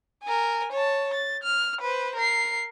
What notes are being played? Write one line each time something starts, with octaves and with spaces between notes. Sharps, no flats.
A#4 G#5
C#5 A5
A6
F6
B4 C5
A#4 C7